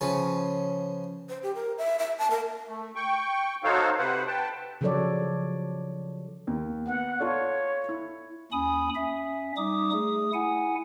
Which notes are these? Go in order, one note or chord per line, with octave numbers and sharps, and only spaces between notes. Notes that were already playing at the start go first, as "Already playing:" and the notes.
C#3 F3 C#4 B4
C5
G4
A#4
E5
E5
A5
A#4
A3
G5 C#6
D#4 F#4 A4 C5 C#5 F5
C3 B4 C5 F#5
B4 G5 A5
C#3 F3 F#3 A4 C#5 D5
D#2
B3 F#5
F4 A4 C#5 D5
E4
D#2 C#4 G#5 B5 D#6
C#4 E5
G3 D#4 D6 D#6
A3 G#4 D#6
E4 F#5 G#5